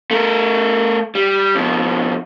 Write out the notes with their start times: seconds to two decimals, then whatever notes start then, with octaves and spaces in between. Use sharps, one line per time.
0.11 A3 A#4
1.15 G3
1.55 F2 B2